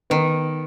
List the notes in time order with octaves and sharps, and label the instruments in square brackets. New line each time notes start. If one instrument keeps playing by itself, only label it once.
[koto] D#3 [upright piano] B3